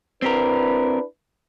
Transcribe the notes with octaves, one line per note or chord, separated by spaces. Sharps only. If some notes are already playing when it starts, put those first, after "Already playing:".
C4 D4 E4 G4 A#4 B4